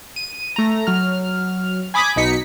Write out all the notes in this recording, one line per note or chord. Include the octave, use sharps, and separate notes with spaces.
D#7
A3 A#5
F#3 F6
G#5 B5 D6 D#6 G#6 B6
B1 B2 D#4 B6 C#7